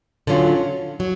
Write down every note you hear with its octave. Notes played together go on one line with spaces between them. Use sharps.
D3 F#3 C#4 F4
F#3